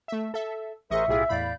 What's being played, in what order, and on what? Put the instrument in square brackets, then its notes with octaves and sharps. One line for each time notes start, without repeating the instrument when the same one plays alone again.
[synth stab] A3 E5
A4 E5
[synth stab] A1 D#5 C#6 [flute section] G#4 A#4 C5 [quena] E5
[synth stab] B1 A2 G#4 [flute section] E4 F4 G4
[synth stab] E2 A2 B5 [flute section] D5 F5 G6